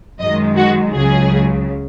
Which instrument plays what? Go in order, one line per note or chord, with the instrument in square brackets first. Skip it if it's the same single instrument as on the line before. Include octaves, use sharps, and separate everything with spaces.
[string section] F#2 D#3 G#3 D#5
F#4
C#2 C#3 F#3 G#4